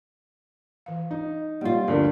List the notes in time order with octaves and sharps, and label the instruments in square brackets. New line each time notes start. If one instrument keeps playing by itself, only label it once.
[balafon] E3 F5
[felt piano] D#4
[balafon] F3 A#3 [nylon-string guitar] G3 F4
[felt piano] D2 G2 [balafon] F3 A#4 D5